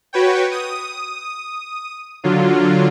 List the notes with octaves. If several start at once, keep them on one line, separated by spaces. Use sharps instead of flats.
F#4 B4 C#5 G5
D#6
D3 F#3 F4